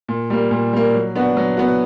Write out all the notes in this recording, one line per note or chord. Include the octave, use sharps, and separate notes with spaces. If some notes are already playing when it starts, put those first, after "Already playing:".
A#2
G3 A#3
A#2
G3 A#3
F#3
B3 D4 F#4
F#3
B3 D4 F#4